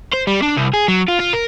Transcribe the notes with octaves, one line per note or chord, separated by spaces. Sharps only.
C5
G3
D4
C2
G#4
F#3
F4
F4
A#4